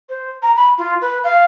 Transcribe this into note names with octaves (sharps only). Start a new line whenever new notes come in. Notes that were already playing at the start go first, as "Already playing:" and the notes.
C5
A#5
B5
F4
B4
F5